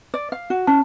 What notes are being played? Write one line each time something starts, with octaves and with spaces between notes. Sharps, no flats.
D5
F5
F#4
C#4 A5